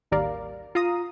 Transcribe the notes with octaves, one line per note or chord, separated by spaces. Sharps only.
A1 D#2 G3 A#4 D5 F5
F4 F5 A#5 D#6